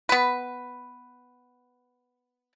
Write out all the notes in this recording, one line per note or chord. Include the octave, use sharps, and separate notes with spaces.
B3 B4